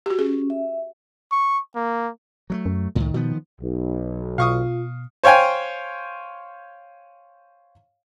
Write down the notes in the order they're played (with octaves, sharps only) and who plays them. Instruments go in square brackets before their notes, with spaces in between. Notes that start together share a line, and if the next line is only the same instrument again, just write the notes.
[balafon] F#4 G4
[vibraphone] C#4 [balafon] G#4
[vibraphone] E5
[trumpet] C#6
A#3
[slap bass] F#3 G#3 A3
[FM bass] F#2
[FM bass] C#2 [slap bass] A2 D#3
[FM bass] B2 [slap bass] D#3 F3 B3
[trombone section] B1
[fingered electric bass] B2 [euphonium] F4 [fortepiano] F5 C#6 D#6
[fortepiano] C5 C#5 F5 G5 G#5